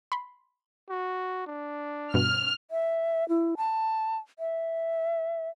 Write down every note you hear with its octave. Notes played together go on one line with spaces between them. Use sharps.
B5 C6
F#4
D4
G2 B2 F6
E5
E4
A5
E5